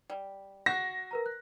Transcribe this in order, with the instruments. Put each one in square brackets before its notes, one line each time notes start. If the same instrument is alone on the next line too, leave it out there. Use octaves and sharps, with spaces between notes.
[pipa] G3
[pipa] F#4 [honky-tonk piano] A#6 [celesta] C7 E7
[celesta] A#4 B4 A#5
F#6